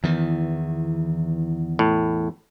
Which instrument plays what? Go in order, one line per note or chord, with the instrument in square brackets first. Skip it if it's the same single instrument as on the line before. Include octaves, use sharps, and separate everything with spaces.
[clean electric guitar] E2 [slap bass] D#3 E3
[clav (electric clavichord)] A2